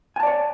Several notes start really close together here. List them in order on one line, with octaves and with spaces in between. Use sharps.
G#5 A5 D5 C#5